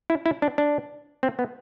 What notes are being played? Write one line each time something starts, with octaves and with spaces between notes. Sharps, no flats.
E4
E4
D4
D4
C4
B3